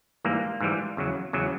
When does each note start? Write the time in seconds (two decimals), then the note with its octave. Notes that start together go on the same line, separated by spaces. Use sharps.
0.24 G#2 E3 G3 A#3
0.61 G#2 E3 G3
0.97 E2 C#3 F#3
1.33 E2 C#3 F#3